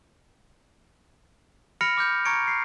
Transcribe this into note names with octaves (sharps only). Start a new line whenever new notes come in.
B5 F6 A#6 C#7 D7 F7
D6 F6 G6
A#5 C#6 G#6 C#7 D7
C7